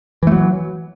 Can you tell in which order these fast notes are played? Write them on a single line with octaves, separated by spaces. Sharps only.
E3 A3 F#3